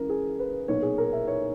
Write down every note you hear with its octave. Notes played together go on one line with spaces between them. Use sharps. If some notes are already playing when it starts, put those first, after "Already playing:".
Already playing: C#2 C#3 E3 A#4
G#4
B4
B1 A#2 C#5
G#4
A#4
E5
C#5